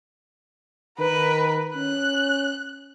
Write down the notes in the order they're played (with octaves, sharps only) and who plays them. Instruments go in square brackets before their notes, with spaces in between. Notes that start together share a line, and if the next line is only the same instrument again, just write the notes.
[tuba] D#3 [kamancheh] A#4 B4
[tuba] C#4 [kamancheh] F#6